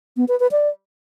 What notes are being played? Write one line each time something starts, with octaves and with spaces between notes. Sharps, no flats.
B3
B4
B4
D5